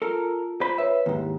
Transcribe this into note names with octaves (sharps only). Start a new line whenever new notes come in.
F4 A4 A#4
C5 B5
B4 C#5 E5
D#2 G#2 E4 G4